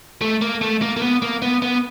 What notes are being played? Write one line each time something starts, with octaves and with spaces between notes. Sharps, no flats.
A3
A#3
A3
A#3
A#3
B3
A#3
B3
B3